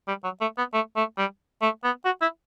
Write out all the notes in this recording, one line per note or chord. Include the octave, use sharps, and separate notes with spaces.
G3
F#3
A3
B3
A3
A3
G3
A3
B3
F#4
E4